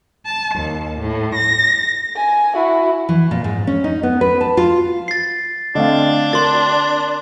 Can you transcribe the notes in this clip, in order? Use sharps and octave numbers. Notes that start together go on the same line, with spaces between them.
A5
D#2
A2
A#6
G#5
E4 F#4
E3
A#2
G#2
C#4
D#4
B3
B4
A5
F4
A6 C7
D3 A3 C4 D4 D#5 F5
A#4 C6 A6